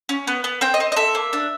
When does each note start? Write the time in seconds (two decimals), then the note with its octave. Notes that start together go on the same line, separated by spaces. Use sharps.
0.09 C#4
0.27 B3
0.44 B3
0.61 C4 G5
0.74 D#5
0.80 C4
0.92 D#5
0.96 A4 E5
1.15 A#3
1.33 D4